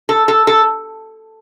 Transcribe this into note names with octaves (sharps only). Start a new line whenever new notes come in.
A4
A4
A4